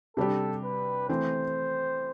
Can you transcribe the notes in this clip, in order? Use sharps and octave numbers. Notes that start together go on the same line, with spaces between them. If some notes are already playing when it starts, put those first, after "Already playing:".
C3 G3 D4 G4 A4
B4
E3 A3 C4 C5